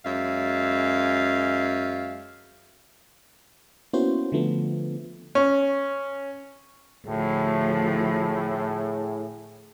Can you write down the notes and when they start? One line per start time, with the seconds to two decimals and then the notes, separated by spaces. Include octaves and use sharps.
0.05 F#2 G#3 E5 F5
3.93 A#3 B3 C#4 E4 F#4 C5
4.32 D3 F3 A3 B3
5.35 C#4
7.06 D2 A2 F3 G#4